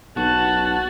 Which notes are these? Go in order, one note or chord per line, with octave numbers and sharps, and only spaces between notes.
B1 F#4 A5 F#6